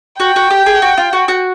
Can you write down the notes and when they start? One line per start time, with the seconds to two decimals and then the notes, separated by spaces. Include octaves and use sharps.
0.20 F#4 G5
0.36 F#4
0.50 G4
0.66 G#4
0.82 F#4
0.97 F4
1.13 F#4
1.28 F#4